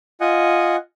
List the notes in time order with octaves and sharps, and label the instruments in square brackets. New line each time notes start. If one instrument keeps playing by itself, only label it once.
[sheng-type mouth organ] F4 D#5 F#5 G#5